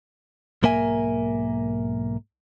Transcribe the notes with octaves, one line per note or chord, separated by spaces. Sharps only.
B1 G#2 A#3 A#4 E5 G#5